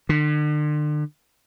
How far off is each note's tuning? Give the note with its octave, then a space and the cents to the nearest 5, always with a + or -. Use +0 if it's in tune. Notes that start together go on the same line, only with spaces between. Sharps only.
D3 +40